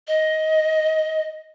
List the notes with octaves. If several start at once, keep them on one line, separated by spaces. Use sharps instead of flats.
D#5